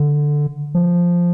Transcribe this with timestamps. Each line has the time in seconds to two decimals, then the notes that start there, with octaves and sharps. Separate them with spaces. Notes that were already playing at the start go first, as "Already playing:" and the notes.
Already playing: D3
0.75 F3